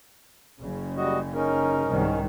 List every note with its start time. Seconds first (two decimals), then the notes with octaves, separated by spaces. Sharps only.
0.61 F#1 C#3
0.96 G3 F#4 D#5
1.34 C#4 D#4 A#4
1.88 C2 G#2 D#3